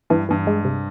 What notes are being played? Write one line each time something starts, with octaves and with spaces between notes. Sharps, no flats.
G2 E3
G2 E3
G#3
C3